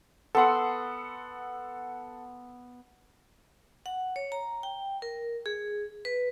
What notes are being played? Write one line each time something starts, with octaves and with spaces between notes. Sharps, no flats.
B3 A4 F#5 C6 E6
F#5
C#5
A#5
G5
A#4
G#4
B4